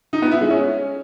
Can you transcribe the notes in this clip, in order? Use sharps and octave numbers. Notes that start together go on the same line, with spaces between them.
D#4
B3
E4
G#3
C#4